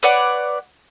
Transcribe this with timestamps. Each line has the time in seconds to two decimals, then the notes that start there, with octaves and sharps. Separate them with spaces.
0.03 B4 C#5 D5 F#5